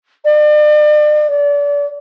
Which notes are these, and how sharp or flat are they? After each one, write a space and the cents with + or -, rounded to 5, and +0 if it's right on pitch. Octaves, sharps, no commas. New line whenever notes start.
D5 +40
D5 -35